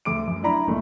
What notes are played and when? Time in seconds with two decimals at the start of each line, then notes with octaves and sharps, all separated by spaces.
0.05 D2 D6 D7
0.27 F#2
0.43 D4 E4 D5 A#5 B5
0.68 G#1 A#2 A3